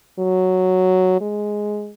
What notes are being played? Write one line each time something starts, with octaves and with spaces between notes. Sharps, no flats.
F#3
G#3